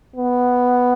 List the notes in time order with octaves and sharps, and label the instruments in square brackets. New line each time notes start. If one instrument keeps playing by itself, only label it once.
[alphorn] B3